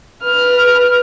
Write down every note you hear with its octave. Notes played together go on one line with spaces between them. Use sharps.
B4 F6